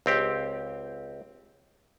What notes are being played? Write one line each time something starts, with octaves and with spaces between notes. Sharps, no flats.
C#2 C4 G4